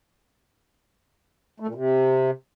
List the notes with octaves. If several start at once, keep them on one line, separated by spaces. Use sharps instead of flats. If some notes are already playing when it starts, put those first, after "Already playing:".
A3
A#2
C3